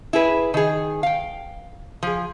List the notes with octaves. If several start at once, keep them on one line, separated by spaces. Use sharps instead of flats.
E4 G#4 B4
D#3 G#4
F5 G5
F3 G#4